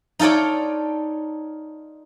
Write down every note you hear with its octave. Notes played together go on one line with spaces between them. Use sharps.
D#4 F4 A4 C#5 D5